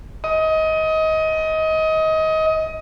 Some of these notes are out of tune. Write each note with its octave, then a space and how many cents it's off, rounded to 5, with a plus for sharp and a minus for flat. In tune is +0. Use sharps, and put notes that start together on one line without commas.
D#5 +25